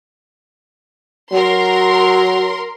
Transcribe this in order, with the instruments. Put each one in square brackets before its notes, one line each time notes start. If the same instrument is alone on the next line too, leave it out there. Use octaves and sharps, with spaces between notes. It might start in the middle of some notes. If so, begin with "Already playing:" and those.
[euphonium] F#3 [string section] A#4 C6